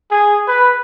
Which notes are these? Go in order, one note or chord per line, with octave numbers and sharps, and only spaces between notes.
G#4
B4